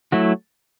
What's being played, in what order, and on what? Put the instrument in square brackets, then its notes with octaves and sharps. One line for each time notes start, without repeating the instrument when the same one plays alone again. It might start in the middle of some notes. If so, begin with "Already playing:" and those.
[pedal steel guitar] F#3 A3 E4 F#4